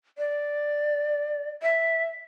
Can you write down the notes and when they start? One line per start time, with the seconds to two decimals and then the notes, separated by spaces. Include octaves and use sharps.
0.18 D5
1.63 E5